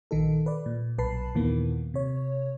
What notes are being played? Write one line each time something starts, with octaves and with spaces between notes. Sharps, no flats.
A#1 D#3 D#4 A4
B4 D5
A#2
B1 B4 A5 B5 C7
D#2 A#2 D#3 E3 A#3 B3
C3 C#5